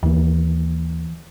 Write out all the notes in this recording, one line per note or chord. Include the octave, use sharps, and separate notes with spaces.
D#2 E3 A#3